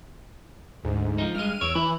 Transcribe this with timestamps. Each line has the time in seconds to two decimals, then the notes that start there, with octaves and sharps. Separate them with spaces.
0.84 D2 G#2
1.18 F3 D#4
1.35 G2 G#3 F6 D#7
1.61 E2 C#5 E6 D7
1.75 E3 E4